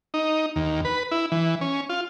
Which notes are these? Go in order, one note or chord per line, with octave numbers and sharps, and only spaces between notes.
D#4
D#2
B4
E4
E3
C#4
F4